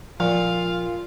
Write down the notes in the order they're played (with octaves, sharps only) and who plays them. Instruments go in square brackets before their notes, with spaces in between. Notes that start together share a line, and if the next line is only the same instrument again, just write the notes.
[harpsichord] A#2 [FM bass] F3 [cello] F4 [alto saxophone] F5